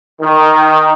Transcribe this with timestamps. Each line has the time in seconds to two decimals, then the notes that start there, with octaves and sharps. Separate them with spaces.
0.21 D#3